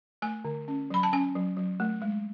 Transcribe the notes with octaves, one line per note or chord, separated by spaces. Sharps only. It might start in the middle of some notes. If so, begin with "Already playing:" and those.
A3 G#5
D3
C#4
F#3 B5
A5
C#4 G#5
F#3
F#3
A3
G#3